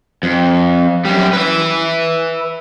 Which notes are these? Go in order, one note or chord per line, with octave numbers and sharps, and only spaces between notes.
F2
F#2 G3
B4 E5